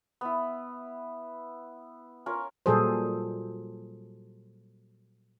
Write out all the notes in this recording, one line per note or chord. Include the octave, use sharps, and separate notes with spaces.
B3 E4
C#4 F4 A#4
A#2 F#3 G3 G#4 A4 C5